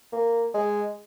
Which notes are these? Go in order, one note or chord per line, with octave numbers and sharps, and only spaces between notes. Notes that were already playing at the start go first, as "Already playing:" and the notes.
A#3
G#3